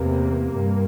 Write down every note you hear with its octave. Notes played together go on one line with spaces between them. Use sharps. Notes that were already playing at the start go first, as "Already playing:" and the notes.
Already playing: E2 C3 A#3
G2